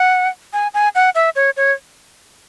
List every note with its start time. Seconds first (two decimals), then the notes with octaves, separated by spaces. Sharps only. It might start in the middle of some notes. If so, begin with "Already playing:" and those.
Already playing: F#5
0.53 G#5
0.74 G#5
0.95 F#5
1.15 E5
1.36 C#5
1.57 C#5